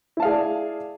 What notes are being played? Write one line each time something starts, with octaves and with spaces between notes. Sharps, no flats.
E4 G#4 D5 F5 A5